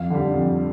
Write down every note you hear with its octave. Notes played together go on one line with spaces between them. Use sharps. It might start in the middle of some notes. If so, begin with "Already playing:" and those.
Already playing: F2 F5
D3 G3
F2